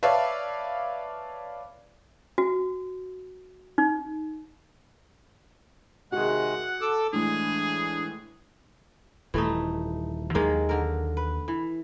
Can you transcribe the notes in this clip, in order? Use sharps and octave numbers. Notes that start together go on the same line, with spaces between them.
B4 C#5 D5 E5 F5 A5
F#4
D#4
C3 D#3 G#3 F#4 G#4 F#5
A4 D6 E6
A2 E3 G#3 D4 G#4
D#1 E3 A3 D#4
D#2 D#3 F#3 G#3 A#3
D3 A#4
B4
E3